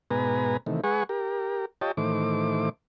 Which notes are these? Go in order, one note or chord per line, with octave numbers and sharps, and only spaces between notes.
G#2 B2 B3 B4 G#5 A#5
C3 D#3 E3 A3
G#3 G#4 B4 F#5 G#5 C#6
G4 A#4
F4 G4 C#5 D#5 G5 A5
A2 D#3 E3 A3 C5 D6